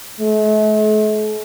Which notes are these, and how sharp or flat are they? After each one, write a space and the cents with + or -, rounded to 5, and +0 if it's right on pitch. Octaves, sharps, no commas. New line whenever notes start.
A3 -45